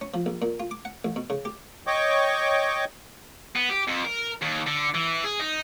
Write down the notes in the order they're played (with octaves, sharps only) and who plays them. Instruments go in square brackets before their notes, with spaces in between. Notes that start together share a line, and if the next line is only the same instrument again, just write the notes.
[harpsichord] C#4
F3
A#1
A#2
F4
D6
F#5
A1
B2
C#3
G4
[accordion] C#5 D#5 G5 C#6 D6
[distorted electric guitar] B3
G4
F2
A#4
D#2
D3
E3
G#4
D#4